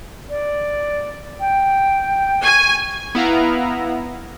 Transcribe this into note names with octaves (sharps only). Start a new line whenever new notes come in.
D5
G5
G#5 C#6
B3 E4 F5 A#5